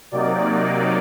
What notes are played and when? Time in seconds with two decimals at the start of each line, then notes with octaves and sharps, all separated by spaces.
0.12 C3 F#3 A#3 D#4 D5
0.48 D5